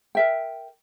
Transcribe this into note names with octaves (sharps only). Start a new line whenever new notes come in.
A#4 E5 G5